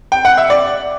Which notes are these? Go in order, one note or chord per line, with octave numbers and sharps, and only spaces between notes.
G5
F#5
E5
D5